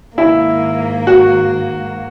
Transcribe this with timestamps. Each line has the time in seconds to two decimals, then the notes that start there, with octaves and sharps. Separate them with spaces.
0.18 G#2 D#3 A#3 E4
1.07 F#4